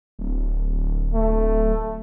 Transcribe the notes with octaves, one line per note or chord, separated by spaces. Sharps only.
D1
A3